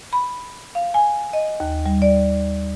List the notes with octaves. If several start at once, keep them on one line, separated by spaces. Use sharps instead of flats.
B5
F5
G#5
D#5
D#2
G3
D5